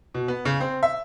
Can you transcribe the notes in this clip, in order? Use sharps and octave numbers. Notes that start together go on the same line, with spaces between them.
B2
B3
C#3
C4
E5